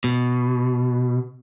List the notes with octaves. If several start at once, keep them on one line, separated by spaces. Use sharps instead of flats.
B2